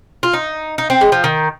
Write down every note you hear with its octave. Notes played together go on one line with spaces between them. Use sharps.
F4
D#4
D#4
C4
G#3
F3
D#3